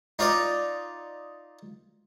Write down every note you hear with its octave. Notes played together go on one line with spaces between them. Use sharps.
D#4 F4 D5 D#5